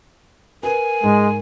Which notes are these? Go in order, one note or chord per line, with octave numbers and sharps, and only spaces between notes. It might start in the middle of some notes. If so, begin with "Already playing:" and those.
A#4 B4 G#5
G#2 G#3